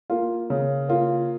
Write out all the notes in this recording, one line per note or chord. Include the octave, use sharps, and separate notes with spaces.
A#3 F4
C#3
A#3 F4